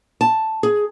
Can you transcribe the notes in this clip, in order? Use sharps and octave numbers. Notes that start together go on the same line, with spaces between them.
A5
G#4